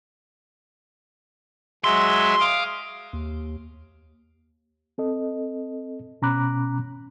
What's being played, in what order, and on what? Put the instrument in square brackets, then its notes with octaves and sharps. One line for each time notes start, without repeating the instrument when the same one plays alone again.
[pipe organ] F#3 G#3 E5 [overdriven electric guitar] C6
[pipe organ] F5 D6 D#6
[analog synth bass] D#2
[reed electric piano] C4 A4 D#5
B2 C#4 A#5 B5 D6 F#6